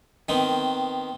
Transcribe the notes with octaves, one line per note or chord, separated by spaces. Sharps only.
D#3 B3 C4